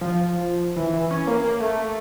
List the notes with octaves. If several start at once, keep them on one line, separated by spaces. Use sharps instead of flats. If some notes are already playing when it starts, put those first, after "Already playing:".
F3
E3
E3
C#4
A#3
A#3
A3